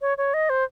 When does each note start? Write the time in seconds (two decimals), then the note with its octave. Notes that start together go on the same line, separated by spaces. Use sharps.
0.01 C#5
0.18 C#5
0.34 D#5
0.50 C5